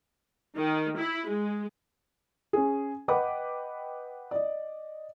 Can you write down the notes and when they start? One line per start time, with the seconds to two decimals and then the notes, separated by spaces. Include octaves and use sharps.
0.55 D#3
0.96 E4
1.28 G#3
2.53 C#4 G#4
3.08 B4 D#5 F#5 G5 B5 D6
4.31 D5 D#5